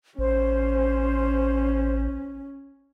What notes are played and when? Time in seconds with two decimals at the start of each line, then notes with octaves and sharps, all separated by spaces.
0.19 A1 C#4 C5